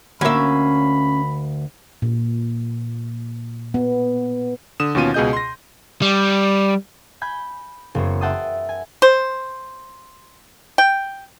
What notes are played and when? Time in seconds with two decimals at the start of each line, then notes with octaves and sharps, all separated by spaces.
0.21 D2 A#3 C#4 E5 B5
2.02 A#2
3.74 B3
4.80 D3 D#6 E7
4.95 D#2 B2 C#4 F4 D#7
5.14 C#2 B2 G#4 D#5 G6
5.33 C6 A#6
6.02 G3
7.21 G#5 B5 G6 G#6
7.95 F#1 F#3 B3 C5 C#5
8.21 E5 F#5 G5 A5 C6 D#6
8.69 G#5
9.02 C5
10.78 G5